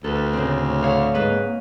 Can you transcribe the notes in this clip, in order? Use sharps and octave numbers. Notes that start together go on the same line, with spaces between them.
D2 A4 B4
A2 C#3 C4
D3 C#5 F5
G#2 B4 D#6
A#3